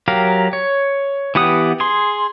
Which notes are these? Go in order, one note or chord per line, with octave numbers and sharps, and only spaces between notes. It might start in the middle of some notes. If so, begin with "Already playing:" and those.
F#3 G4 A#4 F5
C#5
E3 B3 G4 F#5 D#6
G#4 C6